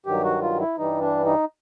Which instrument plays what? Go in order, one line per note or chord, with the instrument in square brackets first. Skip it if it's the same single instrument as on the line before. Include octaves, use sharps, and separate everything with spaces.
[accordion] G2 D#3 F#3 G4
F#4
F4
E4
G2 E3 G3 D#4
D4
D#4